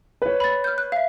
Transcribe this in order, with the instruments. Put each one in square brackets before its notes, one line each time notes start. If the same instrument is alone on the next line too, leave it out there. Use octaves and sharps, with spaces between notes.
[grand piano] B4 C#5
[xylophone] B5 A6
F6 G6
F#6
E5 F5